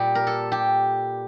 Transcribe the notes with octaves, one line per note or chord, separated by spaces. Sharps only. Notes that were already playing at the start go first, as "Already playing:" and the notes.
Already playing: A#2 G3 G4
A#4
A4
G4